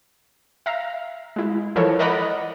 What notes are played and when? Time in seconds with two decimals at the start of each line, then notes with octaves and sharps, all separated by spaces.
0.66 E5 F5 A#5
1.36 G#3 E4
1.76 E3 F3 A4 A#4 C#5
1.99 A#4 D5 D#5 F#5 A#5 B5